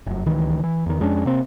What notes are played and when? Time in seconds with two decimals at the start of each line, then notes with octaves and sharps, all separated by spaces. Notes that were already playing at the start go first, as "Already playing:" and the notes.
0.06 F1 F#2
0.26 D1 C#2 D#3 E3
0.64 E3
0.86 E2 D#3
1.00 F2 G#3 C#4 D4
1.25 C3 A#3 C4